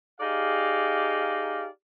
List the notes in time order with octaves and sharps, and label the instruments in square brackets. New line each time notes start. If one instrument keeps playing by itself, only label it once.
[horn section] D#4 G4 G#4 D5 F5